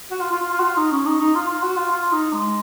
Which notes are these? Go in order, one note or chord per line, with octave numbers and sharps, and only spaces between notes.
F#4
F4
F4
F4
F4
F#4
F4
D#4
C#4
D#4
D#4
F4
F4
F#4
F4
F4
D#4
G#3